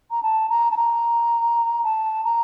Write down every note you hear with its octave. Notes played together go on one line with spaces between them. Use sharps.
A#5
A5
A#5
A5
A#5
A5
A#5